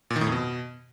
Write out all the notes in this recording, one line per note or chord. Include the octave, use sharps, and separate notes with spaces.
A#2
D#3
A2
F2
B2